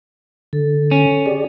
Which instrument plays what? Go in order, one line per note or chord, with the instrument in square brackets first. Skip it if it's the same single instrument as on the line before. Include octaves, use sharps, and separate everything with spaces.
[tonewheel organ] D3 [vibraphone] A4
[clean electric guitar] C#4
[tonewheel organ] G4 G#4 D5